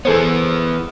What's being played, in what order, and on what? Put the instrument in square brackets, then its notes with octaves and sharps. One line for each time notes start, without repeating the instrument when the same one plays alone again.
[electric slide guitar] E3 B3 [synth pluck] G#4 A4 C5